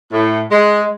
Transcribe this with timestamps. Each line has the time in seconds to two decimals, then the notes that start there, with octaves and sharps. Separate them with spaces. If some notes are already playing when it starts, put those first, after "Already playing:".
0.13 A2
0.52 G#3